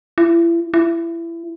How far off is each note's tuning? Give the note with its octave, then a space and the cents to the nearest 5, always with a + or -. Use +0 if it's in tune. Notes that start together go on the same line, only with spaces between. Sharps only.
E4 +35
E4 +25